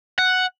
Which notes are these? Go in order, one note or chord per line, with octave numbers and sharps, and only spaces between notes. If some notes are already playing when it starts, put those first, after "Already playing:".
F#5